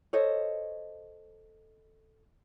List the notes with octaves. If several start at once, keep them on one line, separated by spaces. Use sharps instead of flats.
A4 C5 C#5 D#5